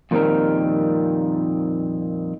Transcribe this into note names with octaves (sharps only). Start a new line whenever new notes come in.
F2 A#2 D#3 G3 C4 A#4